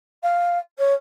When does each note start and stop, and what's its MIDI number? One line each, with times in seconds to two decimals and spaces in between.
0.23 0.59 77
0.78 0.93 73